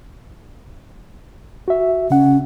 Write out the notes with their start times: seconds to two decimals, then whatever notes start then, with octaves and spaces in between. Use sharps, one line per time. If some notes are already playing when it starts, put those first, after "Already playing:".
1.68 F#4 E5
2.10 C#3 C#4 F#5